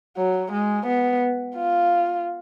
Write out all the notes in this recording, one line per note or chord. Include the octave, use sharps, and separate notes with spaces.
F#3
G#3
B3
F4